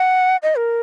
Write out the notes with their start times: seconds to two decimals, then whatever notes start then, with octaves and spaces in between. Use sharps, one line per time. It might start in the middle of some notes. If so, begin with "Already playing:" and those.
Already playing: F#5
0.43 D#5
0.57 A#4